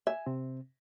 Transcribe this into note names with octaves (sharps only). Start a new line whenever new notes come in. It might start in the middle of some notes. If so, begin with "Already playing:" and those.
E5 G#5
C3 C4